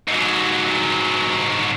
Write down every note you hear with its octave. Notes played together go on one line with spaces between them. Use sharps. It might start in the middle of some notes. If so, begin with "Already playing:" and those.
G#2 F#3